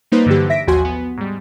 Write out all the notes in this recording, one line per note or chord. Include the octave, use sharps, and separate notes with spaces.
G3 A#3 D#4 B4 C5
G2 D3 E3 F#3 G4
E5 A#6 B6 D7
A1 D#2 F3 F#4 G#5 C6
B3
G#2 G3